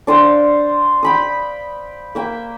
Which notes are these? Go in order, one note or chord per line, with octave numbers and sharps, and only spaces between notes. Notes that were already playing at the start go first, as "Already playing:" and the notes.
D4 C5 F5 G5
G5 B5 D#6
A#3 E5 G5